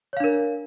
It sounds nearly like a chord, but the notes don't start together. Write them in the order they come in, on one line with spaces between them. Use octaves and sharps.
C#5 F5 D4 A#4